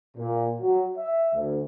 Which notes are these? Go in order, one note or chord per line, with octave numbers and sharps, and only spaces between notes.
A#2
F#3
E5
D2